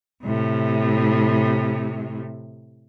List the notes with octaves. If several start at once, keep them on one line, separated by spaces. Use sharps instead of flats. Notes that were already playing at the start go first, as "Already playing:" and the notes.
A2 C3